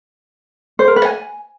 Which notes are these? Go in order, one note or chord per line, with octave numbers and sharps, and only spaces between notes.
C5
A#4
B4
G#5